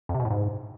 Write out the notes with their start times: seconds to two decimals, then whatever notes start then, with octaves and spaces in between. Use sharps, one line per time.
0.09 F2
0.14 C3
0.20 B2
0.25 A2
0.30 G#2